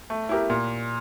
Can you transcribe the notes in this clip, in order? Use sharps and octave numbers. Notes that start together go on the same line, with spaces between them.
A3
E4 G4 A#4
A#2